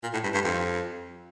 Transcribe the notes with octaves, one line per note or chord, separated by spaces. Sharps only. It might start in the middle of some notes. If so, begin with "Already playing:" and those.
A#2
A2
G2
G2
F2